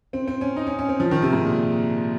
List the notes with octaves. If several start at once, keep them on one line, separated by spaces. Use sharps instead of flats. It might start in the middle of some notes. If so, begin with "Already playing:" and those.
C4
C4
C#4
D#4
C#4
C#4
C4
F3
D#3
C3
G#2
A#2